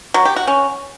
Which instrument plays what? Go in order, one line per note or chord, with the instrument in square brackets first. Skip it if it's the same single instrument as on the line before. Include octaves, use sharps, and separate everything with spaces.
[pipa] F#3
G4
F#4
C#4